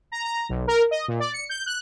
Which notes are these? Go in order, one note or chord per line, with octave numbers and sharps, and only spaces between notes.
A#5
A#5
B1
A#4
D#5
A#2
D5
C#7
G6
F#6